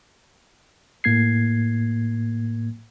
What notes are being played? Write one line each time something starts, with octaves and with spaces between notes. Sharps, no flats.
A2 A#3 G#6 C7